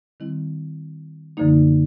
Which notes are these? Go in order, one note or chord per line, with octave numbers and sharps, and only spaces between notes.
D#3 G3 C4 E4
F#2 D3 F3 A#3 D#4